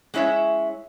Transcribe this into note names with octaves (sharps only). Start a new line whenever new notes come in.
G#3 C#4 E4 C#5 E5